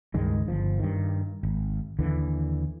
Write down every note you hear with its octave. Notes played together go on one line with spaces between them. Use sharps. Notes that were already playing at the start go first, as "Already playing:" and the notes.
C#2 G2 D#3 G#3
G1 F3
G2 D#3
G#1
D#2 D3 E3